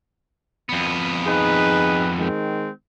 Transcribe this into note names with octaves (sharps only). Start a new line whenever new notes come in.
F2 B3
D#4 G#4 B4
D#3 G#3 C4